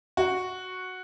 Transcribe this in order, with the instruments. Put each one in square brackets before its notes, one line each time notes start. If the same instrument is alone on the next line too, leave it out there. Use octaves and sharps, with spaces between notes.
[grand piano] F#4